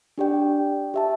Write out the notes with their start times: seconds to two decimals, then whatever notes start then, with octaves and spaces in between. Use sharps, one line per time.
0.18 D4 G4 D5 G5
0.94 G4 E5 A5